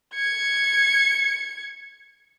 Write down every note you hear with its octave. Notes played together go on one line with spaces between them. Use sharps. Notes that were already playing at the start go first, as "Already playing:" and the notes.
G#6 C#7